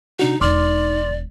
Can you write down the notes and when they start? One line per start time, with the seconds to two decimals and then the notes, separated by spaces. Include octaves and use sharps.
0.19 C3 D4 D#4 F#4
0.41 E1 D#4 D5 C6 D6 F6